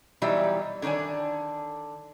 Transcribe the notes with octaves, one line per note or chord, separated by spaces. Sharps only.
B2 E3 F#3 G3 D#4 E5
D3 D#3 D4 C#5 G#5